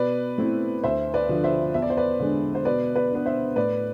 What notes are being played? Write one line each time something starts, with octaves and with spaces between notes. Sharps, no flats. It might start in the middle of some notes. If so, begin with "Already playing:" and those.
Already playing: B2 B4 D5
A3 C4 E4
D2 C5 E5
B4 D5
D3 F3
C5 E5
E2 E5
D5
C5
B4 D5
D3 G#3 D4
C5
B2 B4 D5
B4 D5
B3 D4
C5 E5
A2 B4 D5